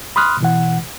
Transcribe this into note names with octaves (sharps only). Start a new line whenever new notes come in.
B5 C6 D#6 F6 F#6
B2 E3 F#5